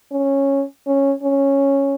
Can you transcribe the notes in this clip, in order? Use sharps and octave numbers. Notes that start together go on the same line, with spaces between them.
C#4
C#4
C#4